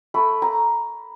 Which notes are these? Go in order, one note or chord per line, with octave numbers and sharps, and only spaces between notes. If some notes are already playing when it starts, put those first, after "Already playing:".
A3 B5
A#5